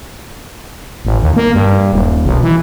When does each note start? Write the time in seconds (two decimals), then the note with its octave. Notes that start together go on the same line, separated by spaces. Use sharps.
1.05 A1
1.21 D#2
1.36 A#3
1.54 G2
1.93 D#1
2.26 B1
2.43 E3